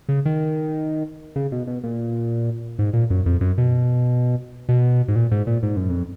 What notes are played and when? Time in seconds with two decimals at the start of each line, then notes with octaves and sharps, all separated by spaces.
0.09 C#3
0.25 D#3
1.36 C#3
1.52 B2
1.67 B2
1.83 A#2
2.79 G#2
2.93 A#2
3.10 F#2
3.26 F2
3.41 F#2
3.58 B2
4.69 B2
5.08 G#2
5.16 A#2
5.31 G#2
5.47 A#2
5.63 G#2
5.77 F#2
5.90 F2